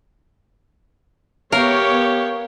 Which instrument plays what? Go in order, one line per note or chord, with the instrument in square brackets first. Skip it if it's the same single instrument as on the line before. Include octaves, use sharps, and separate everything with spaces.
[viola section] B3 C#5 [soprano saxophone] G4 [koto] A#4 [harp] F5